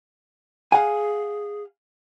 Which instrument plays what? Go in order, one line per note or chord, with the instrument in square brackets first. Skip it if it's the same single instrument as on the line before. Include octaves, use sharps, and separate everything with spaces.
[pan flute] G#4 [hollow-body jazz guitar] F5 F#5 G#5